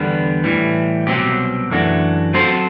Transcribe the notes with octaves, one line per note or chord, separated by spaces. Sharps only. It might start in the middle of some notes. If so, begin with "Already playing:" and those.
Already playing: E2 D3 G3 B3
A2 E3 G3
C2 B2 F#3 C4 G4
F#2 E3 A3 D4 F#4
F#3 C4 F#4 A4 C5